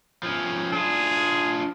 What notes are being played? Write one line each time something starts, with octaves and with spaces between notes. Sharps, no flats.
F3 C#4
D4 F4 G#4